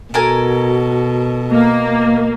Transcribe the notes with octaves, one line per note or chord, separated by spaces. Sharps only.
B2 F#4 A4 A#4 G#5
A#3 D#5